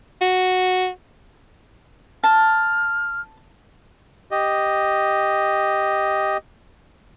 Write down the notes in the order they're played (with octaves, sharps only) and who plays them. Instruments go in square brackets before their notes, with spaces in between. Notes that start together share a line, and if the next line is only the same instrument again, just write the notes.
[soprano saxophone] F#4
[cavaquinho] A5 [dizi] F6
[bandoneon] G4 D#5